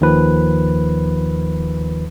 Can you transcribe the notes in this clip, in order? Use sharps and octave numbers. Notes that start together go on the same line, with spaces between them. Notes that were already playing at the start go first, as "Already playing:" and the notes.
D#2 D#3 F3 B4